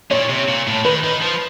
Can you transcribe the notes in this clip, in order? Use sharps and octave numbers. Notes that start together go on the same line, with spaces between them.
A#2 C#5
C3
A#2
A2
D#3 B4
D#3
F3